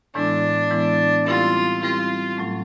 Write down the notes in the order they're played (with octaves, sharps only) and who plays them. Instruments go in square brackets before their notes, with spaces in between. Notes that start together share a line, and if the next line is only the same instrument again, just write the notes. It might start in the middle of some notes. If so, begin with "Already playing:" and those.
[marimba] A2 E3 G#3 B3 E4 [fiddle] D4
[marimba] A2 E3 G#3 B3 E4
[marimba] G3 C4 E4 G4 A#4 [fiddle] F4
[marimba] G3 C4 E4 G4 A#4 [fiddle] F4
[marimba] A2 F#3 A3 C#4